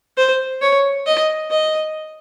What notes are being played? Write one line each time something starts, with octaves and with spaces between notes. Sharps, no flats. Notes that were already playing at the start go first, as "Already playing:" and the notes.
C5
C#5
D#5
D#5